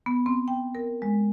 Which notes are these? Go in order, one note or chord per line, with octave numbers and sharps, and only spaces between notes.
B3
C4
G5
A#4
G#3